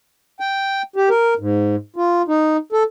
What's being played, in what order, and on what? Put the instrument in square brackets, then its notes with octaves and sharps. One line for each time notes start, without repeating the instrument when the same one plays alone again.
[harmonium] G5
G4
A#4
G#2
F4
D#4
A4